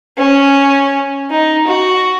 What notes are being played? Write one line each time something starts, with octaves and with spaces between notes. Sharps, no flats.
C#4
D#4
F#4